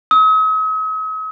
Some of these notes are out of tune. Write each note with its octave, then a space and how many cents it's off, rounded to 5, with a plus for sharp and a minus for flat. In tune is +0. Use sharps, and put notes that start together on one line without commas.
D#6 +45